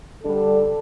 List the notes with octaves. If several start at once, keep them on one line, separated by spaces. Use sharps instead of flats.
D3 G3 D4 A4